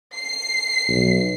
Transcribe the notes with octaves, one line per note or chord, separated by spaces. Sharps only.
C7
B1